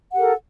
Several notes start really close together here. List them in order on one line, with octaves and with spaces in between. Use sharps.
F#5 G4 A#4 A4